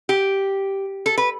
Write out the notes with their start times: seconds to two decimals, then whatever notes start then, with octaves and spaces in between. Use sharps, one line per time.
0.09 G4
1.06 A4
1.18 B4